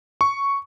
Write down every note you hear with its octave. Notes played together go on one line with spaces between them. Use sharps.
C#6